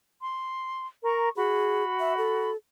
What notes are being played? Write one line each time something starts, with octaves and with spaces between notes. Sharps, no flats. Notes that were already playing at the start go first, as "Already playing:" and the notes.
C6
A#4 A#5 C#6
F#4 G#4 B5
E5
A4